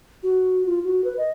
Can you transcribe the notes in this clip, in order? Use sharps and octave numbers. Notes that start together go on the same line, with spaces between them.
F#4
F4
F#4
B4
D#5